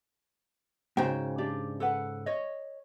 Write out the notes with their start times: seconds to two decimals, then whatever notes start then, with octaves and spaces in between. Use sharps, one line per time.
0.97 G#2 C#3 F#4 C5 G5
1.38 D4 G4 D5
1.80 A4 B4 F#5
2.26 C#5 D#5